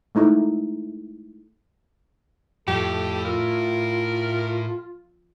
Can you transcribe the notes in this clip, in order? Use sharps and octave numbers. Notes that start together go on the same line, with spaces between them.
G#3 A3 D#4 E4 A4
F2 A2 G4 A4
F4 A#4 E6